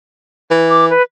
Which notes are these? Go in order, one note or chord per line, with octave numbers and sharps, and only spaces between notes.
E3
D6
B4